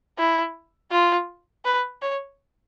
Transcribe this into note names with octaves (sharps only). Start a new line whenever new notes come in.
E4
F4
B4
C#5